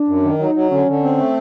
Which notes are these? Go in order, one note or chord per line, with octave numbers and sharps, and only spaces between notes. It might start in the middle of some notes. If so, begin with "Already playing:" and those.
Already playing: D4
F#2
D#3
F#3 D#4
F#3
D3 C#4
D3
C4
A3